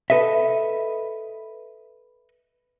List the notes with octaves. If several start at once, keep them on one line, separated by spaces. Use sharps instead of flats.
A4 B4 D#5 E5